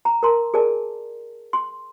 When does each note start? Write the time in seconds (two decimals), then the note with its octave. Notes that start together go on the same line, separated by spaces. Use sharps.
0.05 A#5
0.23 A#4 A5 A#5 C6
0.54 G#4 A#4 D5 G#5 A5
1.53 C6